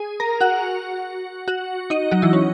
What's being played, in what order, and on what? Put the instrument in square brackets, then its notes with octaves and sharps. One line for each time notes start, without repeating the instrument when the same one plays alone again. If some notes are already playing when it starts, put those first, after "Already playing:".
Already playing: [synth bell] G#4 G#5
A#4 A#5
F#4 F#5
F#4 F#5
D#4 D#5
F#3 F#4
E3 E4
C#4